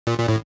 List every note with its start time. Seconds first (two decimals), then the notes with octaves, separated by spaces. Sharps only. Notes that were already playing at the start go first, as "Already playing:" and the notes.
0.07 A#2
0.18 A#2
0.28 A2